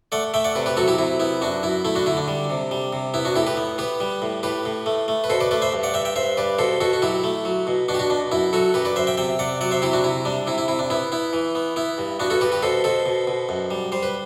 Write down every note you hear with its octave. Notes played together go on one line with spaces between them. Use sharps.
A3 D5 F#5
A3 E5 G5
D5 F#5
C3 B4 D5
G4 B4
F#3 F#4 A4
E4 G4
C3 E4
B3 E4
F#2 D4 F#4
F#2 E4
A3 E4
D4 F#4
D3 E4
D4
G3
C3
G3
C3
B3 E4
D4 F#4
A2 E4 G4
G4 B4
B3
B3 G4 B4
G3
A2
A2 G4 B4
A2
A3
A3
B4
B2 A4 C5
B4 D5
A3 B4 D5
C5 E5
G2
D5 F#5
G2 E5 G5
E5 G5
G2 C5 E5
G2 B4 D5
B2 A4 C5
B2 F#4 A4
F#4
F#3 E4 G4
A3
F#3
B2
B2 D4 F#4
G4
D4 F#4
B2 D4
F#2 E4
F#3 F#4 A4
F#2 G4 B4
B4 D5
F#2 C5 E5
E5 G5
C3 E5 G5
C3 D5 F#5
F#3 D5 F#5
C5 E5
C3 E4 G4
D4 F#4
C3 E4
G3 D4
C3 E4
E4
C3 E4
D4
B3 E4
B3 E4
E3
B3
B3 E4
G2
B3 D4 F#4
F#4 A4
G2 G4 B4
G4 B4
B2 A4 C5
B2 A4 C5
B2
B2
F#2
G3
G3 C5
B4